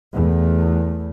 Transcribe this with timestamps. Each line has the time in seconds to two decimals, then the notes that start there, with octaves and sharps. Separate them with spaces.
0.12 E2 A3